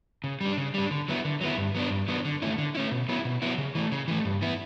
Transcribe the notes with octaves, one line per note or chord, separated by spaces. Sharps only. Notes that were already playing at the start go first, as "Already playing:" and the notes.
C#3
G3 D4
C#3
G3 D4
D3
F#3 B3 E4
D3
F#3 B3 E4
G2
F#3 B3 D4
G2
F#3 B3 D4
D3
A3 C#4 E4
D3
A3 C#4 E4
B2
F#3 B3 E4
B2
F#3 B3 E4
C#3
E3 A3
C#3
E3 A3
G2
E3 B3 E4